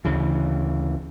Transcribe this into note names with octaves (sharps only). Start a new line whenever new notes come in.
D2 C#3 E3